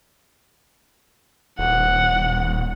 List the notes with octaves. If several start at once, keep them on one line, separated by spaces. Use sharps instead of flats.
D#1 F#5